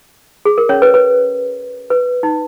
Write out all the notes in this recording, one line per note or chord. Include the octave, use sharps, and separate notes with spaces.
G#4
A#4
C#4 C#5
B4
B4
B4
D#4